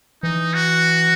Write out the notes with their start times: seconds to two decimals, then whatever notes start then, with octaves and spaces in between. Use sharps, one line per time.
0.23 E3 D#4
0.54 F#4